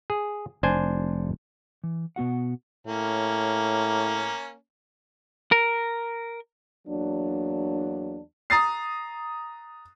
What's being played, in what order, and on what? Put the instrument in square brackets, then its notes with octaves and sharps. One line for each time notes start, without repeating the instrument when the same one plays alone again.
[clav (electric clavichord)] G#4
[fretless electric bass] F1 [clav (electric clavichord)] D4 C5 G#5
[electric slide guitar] E3
B2 B3 F#4 F#5
[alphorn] A2 [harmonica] A#3 C#4
[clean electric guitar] A#4
[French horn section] E2 F#3 A#3 D4
[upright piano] A#5 D#6 A6 C7